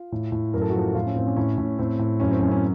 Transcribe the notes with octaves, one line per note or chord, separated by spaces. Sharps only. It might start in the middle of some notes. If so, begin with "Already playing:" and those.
Already playing: F4
A2
A2
F#2 A#4
A4
F#4
F3 A4
A2 F4
C#4
A2 C4
C#4
A2 C#4
A2
A2 C4
A2
F#2 C#4
C4
F#2 C#4
C#4